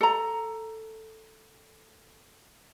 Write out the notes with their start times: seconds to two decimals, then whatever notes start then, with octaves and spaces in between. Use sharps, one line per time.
0.01 A4 A#5